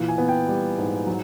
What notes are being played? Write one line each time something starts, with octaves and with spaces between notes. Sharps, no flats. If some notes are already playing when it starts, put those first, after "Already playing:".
Already playing: A#2 E3
G#5
B3
G5
G3
G#2
F#3